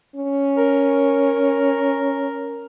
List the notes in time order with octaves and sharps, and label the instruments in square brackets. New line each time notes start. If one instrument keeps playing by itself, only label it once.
[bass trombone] C#4
[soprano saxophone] A#4